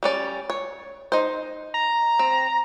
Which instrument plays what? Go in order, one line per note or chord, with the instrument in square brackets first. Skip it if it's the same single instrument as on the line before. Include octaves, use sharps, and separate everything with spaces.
[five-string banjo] G3 C#4 D5
C#5
D#4 C5
[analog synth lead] A#5
[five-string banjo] C4